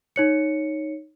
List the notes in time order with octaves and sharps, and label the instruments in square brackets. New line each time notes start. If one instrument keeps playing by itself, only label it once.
[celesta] D#4 C#5 C#7